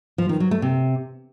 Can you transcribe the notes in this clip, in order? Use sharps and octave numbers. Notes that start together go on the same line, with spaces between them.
F3
D#3
F#3
A3
C3